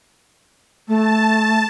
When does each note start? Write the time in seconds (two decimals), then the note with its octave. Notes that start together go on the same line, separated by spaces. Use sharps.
0.88 A3 A5